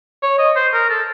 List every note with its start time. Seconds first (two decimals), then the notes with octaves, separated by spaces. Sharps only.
0.23 C#5
0.38 D#5
0.56 C5
0.73 A#4
0.90 A4